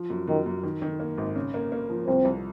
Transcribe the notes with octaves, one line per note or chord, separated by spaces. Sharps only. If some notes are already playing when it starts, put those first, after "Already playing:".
Already playing: F3
F#2
F#2 D#3
F#2
D#3
D#3
A#3
G#1
C#3
A#3
A#3
F3
C2 C4
C2